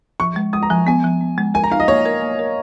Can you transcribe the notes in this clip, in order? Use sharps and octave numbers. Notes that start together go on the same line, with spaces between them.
F3 C#6
G#3
G#3 D#6
A#5
F3 G#5
B3 G#5
F3
B3
G#3
A#4 G#5
A#5
D#4 F5
D#5
A#3 C#5
A#4
A#3
A#4